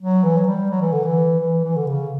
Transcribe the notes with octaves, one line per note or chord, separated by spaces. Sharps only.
F#3
E3
F#3
G3
F#3
E3
D3
E3
E3
E3
D3
C#3